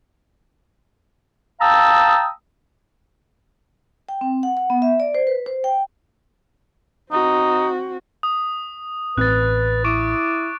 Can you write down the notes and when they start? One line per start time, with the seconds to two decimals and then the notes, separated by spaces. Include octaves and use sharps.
1.61 F5 G5 A5 A#5 D#6 E6
4.09 G5
4.21 C4
4.43 F#5
4.57 F#5
4.70 B3
4.82 E5
5.00 D5
5.15 C5
5.27 B4
5.46 C5
5.64 G5
7.12 C4 D#4 F#4
8.23 D#6
9.18 A1 C4 B4 F#6 A6
9.84 E4 C#6 D6 D7